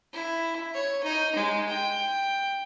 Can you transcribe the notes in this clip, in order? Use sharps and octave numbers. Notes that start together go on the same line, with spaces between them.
E4
C#5
D#4
G#3
G5